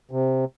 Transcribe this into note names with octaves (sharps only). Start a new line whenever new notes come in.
C3